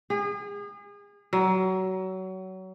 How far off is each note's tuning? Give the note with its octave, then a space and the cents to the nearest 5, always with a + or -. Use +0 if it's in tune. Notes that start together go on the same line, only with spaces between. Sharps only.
G#4 -35
F#3 +25